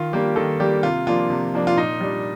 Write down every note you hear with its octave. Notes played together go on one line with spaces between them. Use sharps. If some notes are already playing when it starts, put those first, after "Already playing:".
Already playing: D#3 F4
G3 A#3 D4 G4
D#3 A4
G3 A#3 D4 G4
C3 F4
F3 A#3 D4 F4
C3
F3 A#3 D4
F4
A#2 D#4
G3 D4